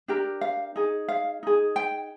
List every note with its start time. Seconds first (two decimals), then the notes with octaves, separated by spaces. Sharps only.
0.08 D4 G4 A#4
0.41 F5
0.76 D#4 G#4
1.08 F5
1.43 D#4 G#4
1.76 G5